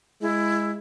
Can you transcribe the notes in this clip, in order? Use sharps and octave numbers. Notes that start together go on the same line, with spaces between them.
G#3 E4